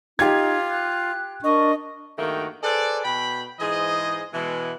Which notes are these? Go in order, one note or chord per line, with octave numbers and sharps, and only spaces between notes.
D#4 F4 G4 G#6
F#6
D4 A#4 D#5 C#6
G2 D#3 A3 A#3 F#4 G5
G#4 A4 B4 C5 D5
B2 G5 B5
G#2 E3 G#4 C5 D#5
B2 E3 G#3